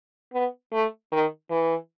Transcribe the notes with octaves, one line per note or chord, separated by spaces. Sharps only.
B3
A3
D#3
E3